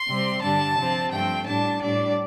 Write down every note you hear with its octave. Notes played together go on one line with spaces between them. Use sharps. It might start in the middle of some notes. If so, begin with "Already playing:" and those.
Already playing: C6
C3 G3 C4
G2 D3 G3 D4 A5
C3 F3 C4
G2 F3 A3 C4 G5
A2 G3 D4 A5
A2 G3 D4 D5